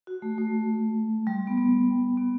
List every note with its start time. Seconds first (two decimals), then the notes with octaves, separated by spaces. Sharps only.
0.07 F#4
0.22 A3
0.38 A3
1.27 G3
1.47 B3
1.57 B3
2.18 B3